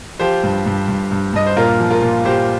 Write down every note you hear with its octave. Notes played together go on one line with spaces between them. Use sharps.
F3 G4 C5
G2
G2
G2
G2
G2 D#5
C5
A#2 F4 A#4
F3
F4 A#4
A#2
A#2 G4 C5